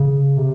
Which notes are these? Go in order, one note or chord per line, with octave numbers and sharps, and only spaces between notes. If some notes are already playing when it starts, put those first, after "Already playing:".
Already playing: C#3
C3